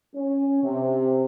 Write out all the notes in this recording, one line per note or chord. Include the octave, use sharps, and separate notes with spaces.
C#4
C3